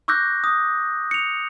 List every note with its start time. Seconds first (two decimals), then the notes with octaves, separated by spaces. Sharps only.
0.08 C#6 D6 E6 F#6 G6 A#6
0.44 D#6
1.11 C#7 F7